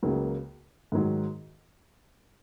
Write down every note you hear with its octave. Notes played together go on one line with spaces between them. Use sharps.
C#2 C#3 F#3 A#3
G#2 D#3 F#3